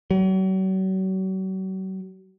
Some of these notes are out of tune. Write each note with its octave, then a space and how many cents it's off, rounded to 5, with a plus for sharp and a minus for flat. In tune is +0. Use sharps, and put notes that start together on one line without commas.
F#3 +40